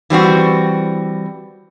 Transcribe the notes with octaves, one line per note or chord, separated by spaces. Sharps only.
E3 G3 C4 F#4